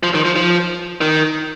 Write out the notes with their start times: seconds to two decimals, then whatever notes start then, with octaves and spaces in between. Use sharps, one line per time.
0.03 F3
0.15 D#3
0.25 F3
0.36 F3
1.01 D#3